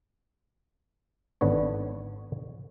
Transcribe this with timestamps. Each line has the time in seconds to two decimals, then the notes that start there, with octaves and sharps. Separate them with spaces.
1.41 G#1 D3 B3 C#5